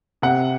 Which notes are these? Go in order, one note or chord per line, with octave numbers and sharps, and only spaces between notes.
C3 F#5